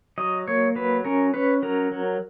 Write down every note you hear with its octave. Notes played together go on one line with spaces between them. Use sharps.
F#3 D#5
A#3 C#5
F#3 B4
C#4 A#4
C#4 B4
F#3 A#4
F#3